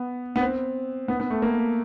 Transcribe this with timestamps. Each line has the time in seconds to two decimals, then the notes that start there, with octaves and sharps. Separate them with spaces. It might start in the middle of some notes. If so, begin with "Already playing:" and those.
Already playing: B3
0.36 B3
0.41 C4
1.08 B3
1.20 B3
1.30 A3
1.42 A#3